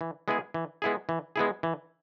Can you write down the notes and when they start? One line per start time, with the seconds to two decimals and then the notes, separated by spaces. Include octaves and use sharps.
0.01 E3
0.28 G#3 B3 E4 G#4
0.54 E3
0.82 G#3 B3 E4 G#4
1.09 E3
1.36 G#3 B3 E4 G#4
1.63 E3